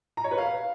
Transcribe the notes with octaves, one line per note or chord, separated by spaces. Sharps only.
A#5
C#5
B4
F5